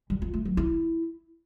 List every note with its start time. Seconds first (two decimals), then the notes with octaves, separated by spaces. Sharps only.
0.10 G3
0.22 F4
0.34 A3
0.45 F#3
0.57 E4